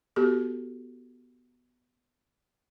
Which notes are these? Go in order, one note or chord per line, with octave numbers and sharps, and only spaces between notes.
B3 F#4 G4 A4